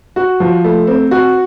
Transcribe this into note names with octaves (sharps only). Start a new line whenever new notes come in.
F#4
F3
A3
C4
F#4